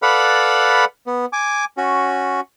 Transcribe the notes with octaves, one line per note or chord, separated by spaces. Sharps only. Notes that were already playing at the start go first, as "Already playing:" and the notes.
A4 B4 D5 F5 F#5 B5
B3
G#5 D6
C#4 F#4